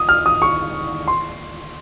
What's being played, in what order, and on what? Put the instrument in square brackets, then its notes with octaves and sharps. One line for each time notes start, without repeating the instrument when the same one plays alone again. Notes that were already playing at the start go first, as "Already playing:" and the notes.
Already playing: [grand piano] D#6
F6
D#6
C#6
C6